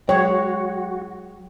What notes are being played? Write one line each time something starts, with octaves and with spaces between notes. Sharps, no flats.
F#3 G#3 F#4 C#5 G5